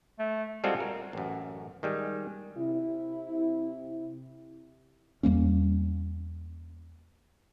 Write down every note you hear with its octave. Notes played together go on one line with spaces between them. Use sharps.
A3
G3 G#3 C4 F4 F#4 A4
A#4
A1 F#2
D#3 G3 G#3
C3 E4
E2 G3 A#3 C#4